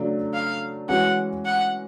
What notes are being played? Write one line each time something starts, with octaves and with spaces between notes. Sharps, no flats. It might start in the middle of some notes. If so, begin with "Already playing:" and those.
Already playing: C#3 F#3 A3 D4
F5
E3 G#3 C#4 F#4 F#5
F#5